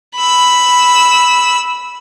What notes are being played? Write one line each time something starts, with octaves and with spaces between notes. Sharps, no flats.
B5 E6